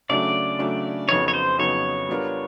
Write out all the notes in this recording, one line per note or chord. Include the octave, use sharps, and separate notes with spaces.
C#3 F#3 A3 D4 D5
C#3 F#3 A3 D4
F2 C#3 F#3 B3 D#4 C#5
C#5
C5
F2 C#3 F#3 B3 D#4 C#5
G3 B3 D4 F4 A#4